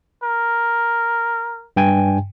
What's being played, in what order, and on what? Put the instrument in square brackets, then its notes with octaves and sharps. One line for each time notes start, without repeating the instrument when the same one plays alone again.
[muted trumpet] A#4
[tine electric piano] G2 G5 G#5